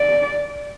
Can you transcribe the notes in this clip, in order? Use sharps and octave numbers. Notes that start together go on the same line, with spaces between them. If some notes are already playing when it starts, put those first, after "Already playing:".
Already playing: D5